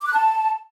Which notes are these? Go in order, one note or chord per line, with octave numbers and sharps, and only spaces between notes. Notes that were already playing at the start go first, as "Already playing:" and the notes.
D6
F#6
A5